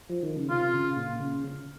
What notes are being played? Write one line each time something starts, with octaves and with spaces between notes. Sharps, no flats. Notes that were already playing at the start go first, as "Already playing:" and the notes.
F3
D#3
C#3
C3 F4
C#3
A#2
C#3